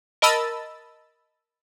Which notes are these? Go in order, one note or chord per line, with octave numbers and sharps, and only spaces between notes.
A#4 D#5 A5 B5 E6 A6